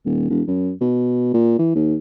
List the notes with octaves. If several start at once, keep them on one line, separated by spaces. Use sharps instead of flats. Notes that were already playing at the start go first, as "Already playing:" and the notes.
D#1
E1
F#2
B2
A#2
E3
D#2